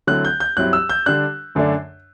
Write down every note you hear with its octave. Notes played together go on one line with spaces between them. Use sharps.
D3 F#3 A3 C4 E4 F#6
G6
G6
G2 F#3 C4 E4 F#6
E6
G6
D3 G3 D4 F#6
F#2 D3 A3 D4